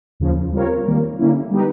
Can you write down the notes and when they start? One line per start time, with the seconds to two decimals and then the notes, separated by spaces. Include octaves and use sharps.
0.20 D#2 C#3 F3
0.52 G3 C4 F4 A#4 C#5
0.86 D#3 G3 A#3
1.19 D3 G3 A#3 C#4 E4
1.51 G3 B3 D#4 G4 B4